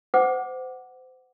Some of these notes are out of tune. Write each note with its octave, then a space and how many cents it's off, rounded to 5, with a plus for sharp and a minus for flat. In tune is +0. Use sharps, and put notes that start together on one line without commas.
C5 -30 F#5 +5 D6 +0